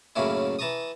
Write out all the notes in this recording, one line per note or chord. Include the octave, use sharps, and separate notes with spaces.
F#2 A2 C#3 A#3 C#4 E4
E3 A5 A#5 C#6 D#6